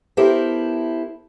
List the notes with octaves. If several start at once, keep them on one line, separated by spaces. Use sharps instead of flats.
B3 E4 G4 A4 A#4 C5